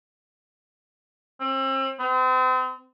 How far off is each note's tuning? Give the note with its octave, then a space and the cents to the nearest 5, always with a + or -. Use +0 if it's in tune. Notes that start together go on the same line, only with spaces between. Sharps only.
C4 +40
C4 -40